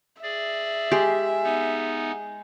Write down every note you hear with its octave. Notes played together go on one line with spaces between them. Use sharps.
G#4 D5 E5
G#3 G4
B3 D#4